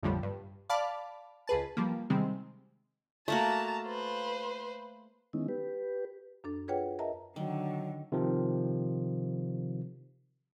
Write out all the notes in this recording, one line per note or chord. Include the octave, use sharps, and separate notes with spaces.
A#1 F2 A2 D3 F3 G3
G2
D5 F5 A5 B5 D6
C#2 G#4 B4 A5
F3 G3 A#3
C3 D#3 G3 G#3 C4
A3 A#3 F#4 A5 A#5
B4 C5
D#3 G#3 B3 C#4 D#4 E4
G4 B4
F#2 D4 A4
F4 G#4 B4 C#5 F#5 G5
A#4 D#5 E5 A5 A#5
D3 D#3 F#3
C3 D#3 F3